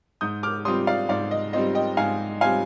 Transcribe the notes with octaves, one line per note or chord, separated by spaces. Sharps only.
G#2 D#6 G6
D6 F6
G3 C4 F4 C6 D#6
D5 F5
G#2 D5 F5
D#5
G3 C4 F4 D#5
D#5 G5
G#2 F5 G#5
G3 C4 F4 F5 G#5